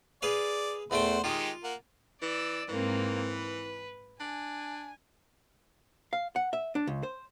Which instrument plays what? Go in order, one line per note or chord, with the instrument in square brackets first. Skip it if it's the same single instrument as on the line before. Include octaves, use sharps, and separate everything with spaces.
[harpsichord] G#4 B4 F5 [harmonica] D5
[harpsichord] E2 A3 G5 [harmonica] C5 F#5
[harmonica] D#3 G#3 G4 [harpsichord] F4
[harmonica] A#3 F#5
[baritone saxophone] E3 [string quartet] D5 E6
[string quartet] G#2 A#3 C4 [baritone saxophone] E3
[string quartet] B4
[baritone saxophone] D4 [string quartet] G#5
[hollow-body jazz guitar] F5
F#5
E5
D4
C#2
C5